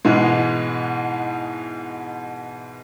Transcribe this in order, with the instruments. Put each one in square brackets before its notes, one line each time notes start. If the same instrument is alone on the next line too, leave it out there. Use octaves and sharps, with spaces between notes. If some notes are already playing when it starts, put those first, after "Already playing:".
[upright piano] G#2 B2 E3 G#3